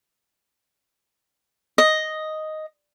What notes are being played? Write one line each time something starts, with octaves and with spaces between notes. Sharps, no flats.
D#5